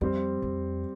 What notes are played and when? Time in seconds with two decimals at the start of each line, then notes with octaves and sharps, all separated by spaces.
0.01 F2 G3 C4 G4
0.42 F2